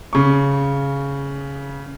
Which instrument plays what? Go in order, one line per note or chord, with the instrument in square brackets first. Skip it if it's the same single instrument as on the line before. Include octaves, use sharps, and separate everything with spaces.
[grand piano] C#3 C#6